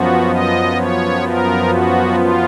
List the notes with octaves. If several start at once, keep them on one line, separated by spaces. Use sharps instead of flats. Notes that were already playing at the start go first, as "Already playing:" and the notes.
Already playing: F#2 F3 B3 F#4
D#5
C#5
A#4
F#4
F4